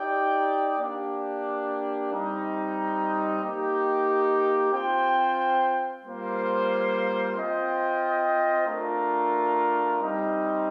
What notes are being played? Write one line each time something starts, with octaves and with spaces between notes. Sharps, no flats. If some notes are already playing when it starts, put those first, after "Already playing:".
Already playing: D#4 G4 D5 G5
A#3 D4 G4
G3 C4 D#4
A#3 D#4 G4
C4 F4 C5 G5
G3 A#3 F4 C5
C4 F4 C5 D#5 G5
A3 D4 F4 A#4
G3 C4 D#4